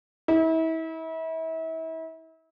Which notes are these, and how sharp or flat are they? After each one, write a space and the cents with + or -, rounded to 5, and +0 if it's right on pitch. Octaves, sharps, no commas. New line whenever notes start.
E4 -35